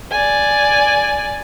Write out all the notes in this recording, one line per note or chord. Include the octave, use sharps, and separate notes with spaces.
D5 G#5